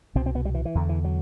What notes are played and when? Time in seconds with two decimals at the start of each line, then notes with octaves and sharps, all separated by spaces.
0.15 C2 B2 C4
0.26 C4
0.35 B3
0.45 G3
0.54 E3
0.65 E3
0.75 E2 D3
0.89 E3
1.04 F#3